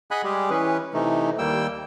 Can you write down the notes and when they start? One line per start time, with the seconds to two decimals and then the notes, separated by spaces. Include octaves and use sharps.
0.11 G#4 D#5 F#5 G#5 B5 F#6
0.24 G3 G#3 G4 G#4
0.50 E3 C#4 B4
0.94 C3 E3 A3 D#4
1.38 D#2 G3 A#3 G5 E6